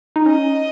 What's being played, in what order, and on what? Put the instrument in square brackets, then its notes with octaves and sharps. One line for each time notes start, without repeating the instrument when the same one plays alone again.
[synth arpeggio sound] D#4
[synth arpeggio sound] C#4 [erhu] D#5